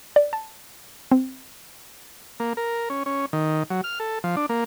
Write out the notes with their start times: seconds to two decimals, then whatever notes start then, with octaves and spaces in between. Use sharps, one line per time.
0.16 D5
0.33 A5
1.11 C4
2.40 A#3
2.57 A#4
2.90 C#4
3.06 C#4
3.33 D#3
3.70 F#3
3.84 F6
4.00 A4
4.24 F3
4.37 D4
4.49 A#3